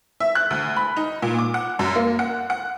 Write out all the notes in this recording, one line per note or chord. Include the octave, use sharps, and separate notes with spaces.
E5
F#6
D2
B5
D#4
A#2
D6
F#5
F#2
A#3
F#5
F#5